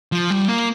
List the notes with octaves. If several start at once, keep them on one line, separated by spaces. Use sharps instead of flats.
F3
G3
A#3